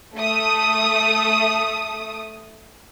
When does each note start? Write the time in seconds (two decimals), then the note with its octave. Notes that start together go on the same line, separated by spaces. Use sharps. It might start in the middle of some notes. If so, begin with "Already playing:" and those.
0.14 A3 D#6